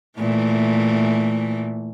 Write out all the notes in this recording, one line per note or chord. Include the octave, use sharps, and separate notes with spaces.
A#2 E3 A3